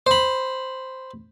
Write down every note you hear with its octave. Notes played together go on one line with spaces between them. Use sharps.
C5 B5